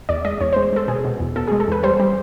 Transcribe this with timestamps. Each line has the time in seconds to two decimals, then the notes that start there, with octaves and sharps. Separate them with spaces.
0.09 E2 D5
0.25 G#3 D#5
0.41 E2 C#5
0.53 G#3 C5
0.73 G#3 A4
0.88 B2 G#4
1.04 B2
1.20 E2
1.36 B2 A4
1.47 G#3 G#4
1.60 A4
1.68 E2 B4
1.83 G3 C5
2.00 G3